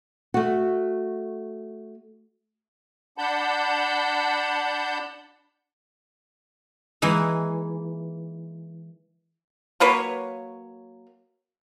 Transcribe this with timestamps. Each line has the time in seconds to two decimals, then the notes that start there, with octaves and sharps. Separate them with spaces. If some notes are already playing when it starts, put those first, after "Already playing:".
0.34 A3 F#4
3.18 D4 F#5 A5 B5 G6
7.02 E3 G#3 A#3 D#4 B4
9.80 F#3 A#3 B4 C#5